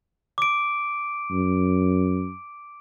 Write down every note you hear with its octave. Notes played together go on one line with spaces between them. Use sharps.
D6 D7
F#2